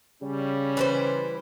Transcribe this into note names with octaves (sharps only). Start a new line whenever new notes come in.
C#3 G3 C#4
E3 B4 C5